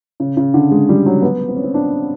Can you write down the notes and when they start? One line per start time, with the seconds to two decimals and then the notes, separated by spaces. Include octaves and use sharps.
0.20 C#3
0.37 C#3
0.54 D3
0.71 G#3
0.89 G3
1.06 F#3
1.22 B3
1.49 C4
1.56 C#4
1.64 C4
1.74 D4